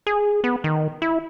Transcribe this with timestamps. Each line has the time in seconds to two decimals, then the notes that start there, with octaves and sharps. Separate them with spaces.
0.07 G#4
0.44 B3
0.64 D#3
1.02 E4